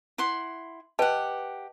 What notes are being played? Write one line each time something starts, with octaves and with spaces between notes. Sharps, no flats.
E4 F#5 C6
G4 B4 D#5 F#5 A5